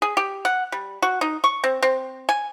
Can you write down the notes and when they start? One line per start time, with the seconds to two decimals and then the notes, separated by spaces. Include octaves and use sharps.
0.02 G#4
0.17 G4
0.45 F#5
0.72 G3
1.02 F#4
1.21 D#4
1.44 C#6
1.64 C4
1.82 C4
2.29 G#5